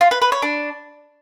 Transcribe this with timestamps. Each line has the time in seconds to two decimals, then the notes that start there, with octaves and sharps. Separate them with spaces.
0.01 F4
0.11 B4
0.22 B4
0.32 C#5
0.42 D4